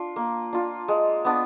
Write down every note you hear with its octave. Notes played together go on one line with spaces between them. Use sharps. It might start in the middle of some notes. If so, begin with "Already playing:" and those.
Already playing: D4 F4
A#3
D4 F4
G#3
B3 D4